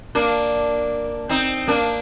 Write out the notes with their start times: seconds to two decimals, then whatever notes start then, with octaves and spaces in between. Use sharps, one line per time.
0.15 A#3 D4
1.29 C4 D#4
1.68 A#3 D4